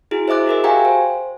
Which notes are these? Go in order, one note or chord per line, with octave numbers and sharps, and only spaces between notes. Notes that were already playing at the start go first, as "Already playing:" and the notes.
E4 F#4 G#4
C5 D#5 E5 D6 F#6
F#4 G#4 A#4 E5
F#4 G4 F5 G5 G#5 A#5
C5